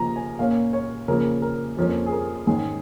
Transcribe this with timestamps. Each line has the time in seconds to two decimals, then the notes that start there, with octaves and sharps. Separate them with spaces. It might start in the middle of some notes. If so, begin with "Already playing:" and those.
Already playing: C#3 F3 A#3 A#5
0.16 G#5
0.39 A#2 A#3 C#4 F5
0.73 C#5
1.08 C#3 F3 A#3 C#4 A#4
1.42 A#4
1.77 F2 F3 A#3 C#4
2.06 G#4
2.12 A#4
2.47 G#2 D#3 G#3 C#4 G#4